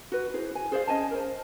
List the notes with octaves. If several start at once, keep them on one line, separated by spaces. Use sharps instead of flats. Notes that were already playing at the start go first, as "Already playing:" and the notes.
F#4 B4
E4 G#4 C5
G#5
G#4 C5 D5 F5
C#4 D#5 G#5 A5
A#4 C5